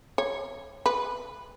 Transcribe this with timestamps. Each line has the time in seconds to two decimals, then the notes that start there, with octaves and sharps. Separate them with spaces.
0.18 C#5
0.86 B4